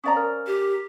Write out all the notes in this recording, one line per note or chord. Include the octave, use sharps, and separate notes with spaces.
C#4 C5 D5 F5 A#5 D#6
A#4 F6
G4